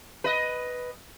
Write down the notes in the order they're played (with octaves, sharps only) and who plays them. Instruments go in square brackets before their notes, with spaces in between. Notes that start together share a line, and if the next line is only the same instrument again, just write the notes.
[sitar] B4 D#5